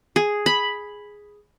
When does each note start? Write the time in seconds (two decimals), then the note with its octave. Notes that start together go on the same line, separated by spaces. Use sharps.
0.16 G#4
0.46 B5